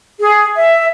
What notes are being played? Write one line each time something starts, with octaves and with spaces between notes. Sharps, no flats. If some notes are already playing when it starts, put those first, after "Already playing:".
G#4
E5